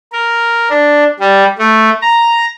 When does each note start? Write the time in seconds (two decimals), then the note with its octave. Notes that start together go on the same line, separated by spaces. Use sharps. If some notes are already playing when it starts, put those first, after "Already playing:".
0.12 A#4
0.70 D4
1.20 G3
1.58 A3
2.02 A#5